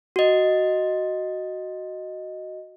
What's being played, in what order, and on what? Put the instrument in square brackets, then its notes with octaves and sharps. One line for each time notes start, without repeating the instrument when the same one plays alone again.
[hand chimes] F#4 D#5